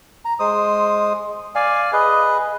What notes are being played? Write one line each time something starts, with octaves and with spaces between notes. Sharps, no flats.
A#5
G#3 C5 D#6
D5 F5 G#5
G#4 B4 D#5